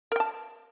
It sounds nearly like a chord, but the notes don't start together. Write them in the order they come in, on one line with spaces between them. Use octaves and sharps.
A#4 G5 A5